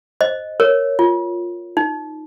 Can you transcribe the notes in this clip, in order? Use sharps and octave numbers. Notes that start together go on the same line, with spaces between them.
C5 D#5
A#4 C#5
F4
D#4